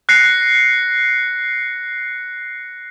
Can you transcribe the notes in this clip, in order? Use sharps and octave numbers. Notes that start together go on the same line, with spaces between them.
F#6 A#6 C7 C#7